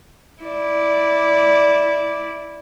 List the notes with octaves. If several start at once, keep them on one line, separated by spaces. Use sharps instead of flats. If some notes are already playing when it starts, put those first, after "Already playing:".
E4 D5